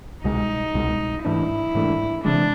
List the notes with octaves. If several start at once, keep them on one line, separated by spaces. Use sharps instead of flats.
C2 B2 G#3 D#4
C2 B2 G#3
G#2 E3 A3 D4 E4
G#2 E3 A3 D4
C3 E3 G#3 D4